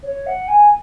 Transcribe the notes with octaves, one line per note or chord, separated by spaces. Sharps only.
C#5
F#5
G#5